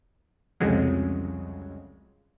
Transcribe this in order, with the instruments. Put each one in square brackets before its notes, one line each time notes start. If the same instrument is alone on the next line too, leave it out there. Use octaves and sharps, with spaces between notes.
[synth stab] C2 F2 C#3 F#3 G#3